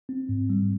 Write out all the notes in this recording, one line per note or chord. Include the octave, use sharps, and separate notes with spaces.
C4
G#2
G3